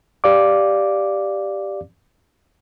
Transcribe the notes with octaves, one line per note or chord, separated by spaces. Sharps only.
G4 D5 F5 D6